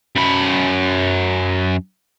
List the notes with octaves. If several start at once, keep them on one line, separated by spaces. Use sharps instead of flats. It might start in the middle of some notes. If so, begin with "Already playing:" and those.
F#2 B5